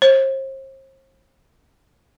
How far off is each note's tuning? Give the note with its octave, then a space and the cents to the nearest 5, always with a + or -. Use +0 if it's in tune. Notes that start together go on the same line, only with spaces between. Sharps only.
C5 +40